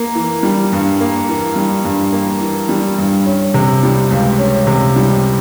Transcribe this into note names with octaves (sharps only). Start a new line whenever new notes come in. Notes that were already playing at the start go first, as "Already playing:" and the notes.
Already playing: A#3
E3
G3
G2
A#3
E3
G3
G2
A#3
E3
G3
G2
C#4
C3
G3
C#2
C#4
C3
G3